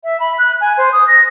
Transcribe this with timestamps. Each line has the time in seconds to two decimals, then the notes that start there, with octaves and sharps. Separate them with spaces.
0.04 E5
0.20 B5
0.39 F#6
0.61 G#5
0.78 C5
0.93 D#6
1.08 A#6